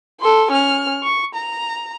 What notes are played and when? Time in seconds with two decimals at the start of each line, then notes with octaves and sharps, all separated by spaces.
0.20 A4 C6
0.51 C#4 F6
1.03 C#6
1.34 A#5